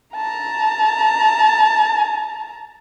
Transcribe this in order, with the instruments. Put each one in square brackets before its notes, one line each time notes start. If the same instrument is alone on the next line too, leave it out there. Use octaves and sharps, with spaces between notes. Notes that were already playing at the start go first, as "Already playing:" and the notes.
[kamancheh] A5 A#5